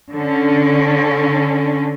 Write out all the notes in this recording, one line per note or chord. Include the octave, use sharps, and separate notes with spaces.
D3 C#4